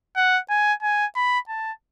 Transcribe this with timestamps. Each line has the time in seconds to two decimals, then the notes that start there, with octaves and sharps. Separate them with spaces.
0.16 F#5
0.50 G#5
0.82 G#5
1.16 B5
1.48 A5